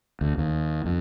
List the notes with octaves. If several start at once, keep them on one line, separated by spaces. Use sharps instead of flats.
D2
D#2
F2